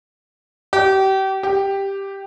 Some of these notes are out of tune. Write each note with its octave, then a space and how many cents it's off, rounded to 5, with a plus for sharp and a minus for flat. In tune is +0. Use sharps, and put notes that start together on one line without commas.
G4 -30
G4 +5